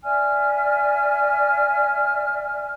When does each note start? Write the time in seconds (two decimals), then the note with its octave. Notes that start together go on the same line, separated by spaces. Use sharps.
0.04 D5 E5 G#5 F6